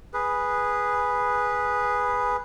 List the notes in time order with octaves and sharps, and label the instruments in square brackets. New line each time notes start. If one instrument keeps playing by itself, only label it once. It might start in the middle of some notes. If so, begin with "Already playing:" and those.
[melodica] G#4 B4